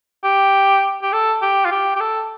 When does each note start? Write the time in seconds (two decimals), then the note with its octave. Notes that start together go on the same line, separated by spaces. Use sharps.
0.24 G4
1.02 G4
1.12 A4
1.42 G4
1.65 F4
1.71 G4
1.95 G4
2.00 A4